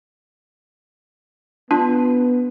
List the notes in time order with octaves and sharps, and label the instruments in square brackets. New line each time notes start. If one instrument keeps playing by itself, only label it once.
[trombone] B3 [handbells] D4 F4